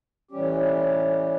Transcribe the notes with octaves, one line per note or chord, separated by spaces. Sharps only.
A2 E3 G3 C#4 G4